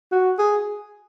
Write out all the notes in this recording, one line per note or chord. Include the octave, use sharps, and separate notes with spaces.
F#4
G#4